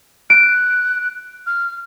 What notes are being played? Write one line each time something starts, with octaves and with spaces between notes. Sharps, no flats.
F#6 D7
F6